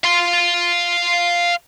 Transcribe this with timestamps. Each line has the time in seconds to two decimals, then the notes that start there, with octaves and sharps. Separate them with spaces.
0.04 F5 C6